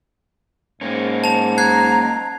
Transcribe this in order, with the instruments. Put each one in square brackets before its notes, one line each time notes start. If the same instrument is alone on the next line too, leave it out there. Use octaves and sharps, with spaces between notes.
[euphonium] G#2 [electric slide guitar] A#3 C#4
[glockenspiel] A5 F7
[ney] A#5 [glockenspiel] F#6 G#6 C7